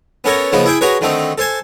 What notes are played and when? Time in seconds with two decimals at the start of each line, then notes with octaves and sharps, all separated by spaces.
0.24 B3 C#4 A4 A#4 C#5
0.52 C#3 F3 A#3 B3 D#4
0.66 E4 G#4 G5 G#5
0.81 F#4 G#4 A#4 B4 C#5
1.01 D3 D#3 A3 C4 D#4
1.38 A4 C5 G#5 A5